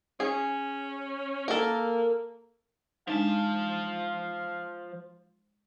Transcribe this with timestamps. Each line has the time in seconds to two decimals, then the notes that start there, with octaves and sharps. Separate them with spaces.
0.20 C#4 G#4
1.48 A#3 A4 A#4
3.07 F3 G#3 D4 D#4 F5 A5